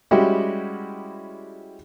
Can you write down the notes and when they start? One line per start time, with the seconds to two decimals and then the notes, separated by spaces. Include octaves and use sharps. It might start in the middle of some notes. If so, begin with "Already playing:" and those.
0.11 G3 G#3 C#4 E4 F#4 G4